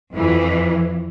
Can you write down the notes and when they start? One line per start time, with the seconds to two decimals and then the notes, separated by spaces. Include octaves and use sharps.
0.12 F2 E3